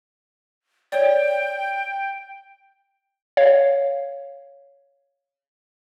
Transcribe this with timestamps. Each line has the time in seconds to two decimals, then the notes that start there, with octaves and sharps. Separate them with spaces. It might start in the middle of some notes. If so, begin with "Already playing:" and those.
0.92 C#5 D5 G5
3.37 C#5 F5